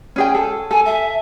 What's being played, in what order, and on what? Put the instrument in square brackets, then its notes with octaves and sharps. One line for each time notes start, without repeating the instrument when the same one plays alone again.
[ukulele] C#4 G#4 G5
A4
[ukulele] A4 [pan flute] G#5
[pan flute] E5